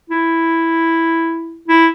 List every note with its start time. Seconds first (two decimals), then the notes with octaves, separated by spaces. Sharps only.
0.10 E4
1.68 E4